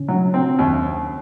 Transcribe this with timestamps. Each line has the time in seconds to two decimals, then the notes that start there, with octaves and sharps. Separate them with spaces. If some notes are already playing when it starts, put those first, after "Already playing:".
Already playing: C#3 C#4
0.08 F#3
0.34 C4
0.59 D#2